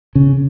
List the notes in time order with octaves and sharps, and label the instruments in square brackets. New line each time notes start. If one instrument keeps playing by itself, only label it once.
[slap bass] C#3